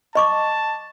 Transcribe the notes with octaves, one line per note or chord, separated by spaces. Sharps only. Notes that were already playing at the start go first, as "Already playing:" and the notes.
D#5 A5 C#6 D6